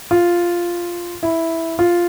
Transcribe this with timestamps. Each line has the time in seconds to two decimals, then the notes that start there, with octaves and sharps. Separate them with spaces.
0.11 F4
1.23 E4
1.79 F4